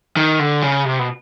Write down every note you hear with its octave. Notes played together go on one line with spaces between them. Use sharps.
D#3
D3
C#3
C3
B2